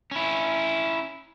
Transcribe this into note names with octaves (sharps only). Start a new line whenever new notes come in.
C#4 E4